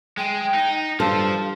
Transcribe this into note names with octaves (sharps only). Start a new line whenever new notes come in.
G#3 G5
D#4
G2 F3 A4 F5